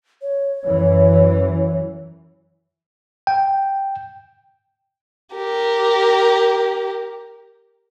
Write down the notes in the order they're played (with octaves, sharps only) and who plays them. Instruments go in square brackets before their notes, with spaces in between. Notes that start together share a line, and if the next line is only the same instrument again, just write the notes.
[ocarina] C#5
[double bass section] F#2 E3
[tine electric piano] G5
[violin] G4 A#4